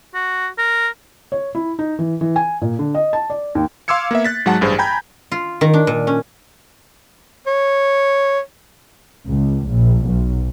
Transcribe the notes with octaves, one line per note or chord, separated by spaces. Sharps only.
F#4
A#4
C#5
E4
D#4
E3
E3
G#5
A#2
D3
D#5
A5
D5
D#2
F5 C6 D6 E6 G#6 C#7
A#3 B3 E5
F#6 A6 B6
G#2 F#3 G#3 F#5 A5
A1 G2 G#4 C5
G5 G#5 A#5 B5 G6 G#6
F4
D#3
D4
A#2
C#4
C#5
C#2
A#1
B1